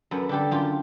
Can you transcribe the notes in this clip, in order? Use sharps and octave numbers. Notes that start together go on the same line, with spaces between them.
F#2 A4 B4
D3 G3 G4 A4
F#2 F4 G4